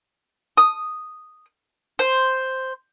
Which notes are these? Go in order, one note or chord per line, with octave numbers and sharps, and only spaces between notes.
D#6
C5